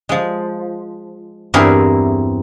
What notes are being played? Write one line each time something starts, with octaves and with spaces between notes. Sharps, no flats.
F3 G#3
E2 G2 C4 E4 G#4 A#4